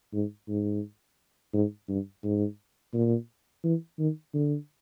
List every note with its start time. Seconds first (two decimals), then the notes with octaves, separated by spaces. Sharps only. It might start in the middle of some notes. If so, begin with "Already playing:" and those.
0.13 G#2
0.49 G#2
1.54 G#2
1.89 G2
2.24 G#2
2.94 A#2
3.64 E3
3.99 D#3
4.34 D3